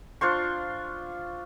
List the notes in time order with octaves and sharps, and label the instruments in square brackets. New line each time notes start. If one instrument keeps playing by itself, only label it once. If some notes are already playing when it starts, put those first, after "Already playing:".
[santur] D4 F4 C5 C#6